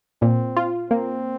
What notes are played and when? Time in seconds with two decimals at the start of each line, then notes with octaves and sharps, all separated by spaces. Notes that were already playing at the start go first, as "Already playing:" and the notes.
0.22 A#2 C4
0.57 F4
0.90 A#3 C4